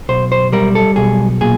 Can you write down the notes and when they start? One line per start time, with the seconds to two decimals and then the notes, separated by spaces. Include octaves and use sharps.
0.09 B1 C5
0.32 C5
0.52 G3 A#4
0.75 A4
0.96 B1 G#4
1.41 A#2 G#4